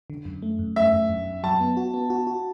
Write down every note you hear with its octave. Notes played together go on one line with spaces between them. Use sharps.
D3
F#2
A3
F#2
A3 E5
F#2
F#2
F#2
F#3 A5
B3
F#4
B3
F#4
F#4